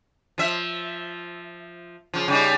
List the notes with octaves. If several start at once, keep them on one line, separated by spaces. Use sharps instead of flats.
F3 E5
C#3 F3
C#3 G3 D#4